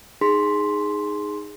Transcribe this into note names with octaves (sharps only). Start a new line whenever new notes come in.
D#4 G#4 C6 B6